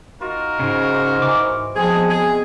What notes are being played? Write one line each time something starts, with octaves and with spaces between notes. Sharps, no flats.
D#4 F4 F#4 A#4
G#2 C#3
C5 D5 D#5
E3 D6
B2 F3 G#3 C4 G#4
G#4